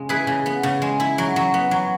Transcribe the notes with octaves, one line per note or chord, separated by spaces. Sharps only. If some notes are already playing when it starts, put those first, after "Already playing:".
Already playing: C#3 G#3
E4 G#4 B4
C#3
B3
C#3
G#3
E4
F#3
F#3
B3
F#3